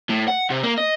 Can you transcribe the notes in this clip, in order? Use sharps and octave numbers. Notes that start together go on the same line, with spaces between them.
A2
F#5
C3
A#3
D#5